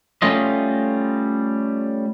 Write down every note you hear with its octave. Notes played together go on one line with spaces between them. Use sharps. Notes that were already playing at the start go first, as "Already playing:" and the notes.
G3 A3 C#4 F4 D#5